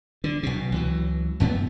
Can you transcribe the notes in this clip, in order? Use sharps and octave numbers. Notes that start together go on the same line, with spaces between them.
D3
B1 B2
C#2 E3 F#3
F1 F#2 A3 B3